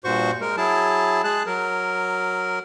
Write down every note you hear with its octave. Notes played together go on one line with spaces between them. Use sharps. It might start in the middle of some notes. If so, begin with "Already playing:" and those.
G2 A#2 F#4 C5 C#6
G#3 A#4
F#3 E4 G#4 A5
G#3 G#4 A5 F#6
F#3 A#4